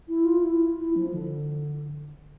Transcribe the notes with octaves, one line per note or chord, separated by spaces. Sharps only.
E4
F4
E4
E4
F3
D3